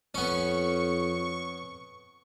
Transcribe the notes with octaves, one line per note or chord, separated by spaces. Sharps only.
F2 B3 C#4 C#6